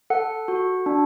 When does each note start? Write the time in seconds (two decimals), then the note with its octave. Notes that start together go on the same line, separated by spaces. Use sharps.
0.10 A4 F#5
0.48 F#4
0.86 D4